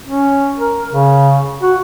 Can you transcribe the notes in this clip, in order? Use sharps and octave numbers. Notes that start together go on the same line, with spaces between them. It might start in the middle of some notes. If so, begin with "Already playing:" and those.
C#4
A#4
C#3
F#4